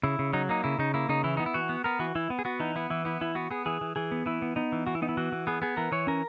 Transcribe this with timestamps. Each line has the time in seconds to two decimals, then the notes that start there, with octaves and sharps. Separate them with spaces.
0.03 C#3 E4
0.19 C#3
0.33 F#3 D#4
0.49 A#3 D#4
0.64 C#3 E4
0.79 C#3 D#4
0.94 A#3 E4
1.09 C#3 D#4
1.24 E3 E4
1.37 B3 D#4
1.46 E4
1.54 E3 F#4
1.69 B3
1.84 B3 A#4
1.99 E3 F#4
2.15 E3 E4
2.30 B3
2.39 G#4
2.45 B3 F#4
2.60 E3 D#4
2.76 B3 E4
2.90 E3 E4
3.05 B3 E4
3.21 E3 E4
3.35 B3 F#4
3.51 B3 G#4
3.66 E3 G#4
3.81 E3
3.96 E3 G#4
4.11 B3
4.26 E3 E4
4.42 B3
4.56 B3 D#4
4.72 E3
4.87 E3 F#4
4.95 E4
5.02 B3 D#4
5.09 E4
5.17 E3 F#4
5.32 E3
5.47 B3 G#4
5.62 B3 G#4
5.77 E3 A#4
5.92 E3 C#5
6.07 C#4 A#4